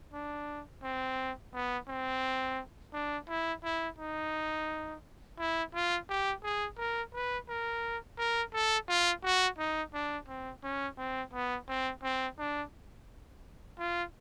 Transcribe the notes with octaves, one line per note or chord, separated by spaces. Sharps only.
D4
C4
B3
C4
D4
E4
E4
D#4
E4
F4
G4
G#4
A#4
B4
A#4
A#4
A4
F4
F#4
D#4
D4
C4
C#4
C4
B3
C4
C4
D4
F4